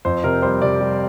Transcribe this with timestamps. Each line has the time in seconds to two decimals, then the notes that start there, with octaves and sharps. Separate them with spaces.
0.05 F2 C5
0.24 C3 A#4
0.42 G3 C5
0.62 C3 D5
0.80 G3